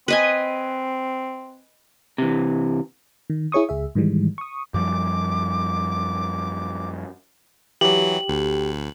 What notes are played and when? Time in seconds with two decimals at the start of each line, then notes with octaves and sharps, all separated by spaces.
0.08 C4 B4 D#5 G#5
2.18 C3 E3
3.30 D#3
3.52 E4 G#4 C#5 C#6 D#6
3.69 C#2 G#4 E5
3.95 G#2 D#3 E3 G3 G#3
4.38 C#6 D#6
4.74 F#2 F3 G3 D6
7.81 E3 F#3 G4 F#7
8.28 D2